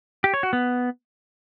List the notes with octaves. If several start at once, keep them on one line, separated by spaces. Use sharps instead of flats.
G4
C#5
F#4
B3